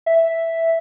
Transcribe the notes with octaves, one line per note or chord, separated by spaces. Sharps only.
E5